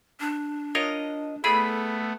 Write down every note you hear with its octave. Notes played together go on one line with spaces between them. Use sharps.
D4
F4 A#4 C#5 D#5
A3 B3 E4 G#4 A4 D5 B5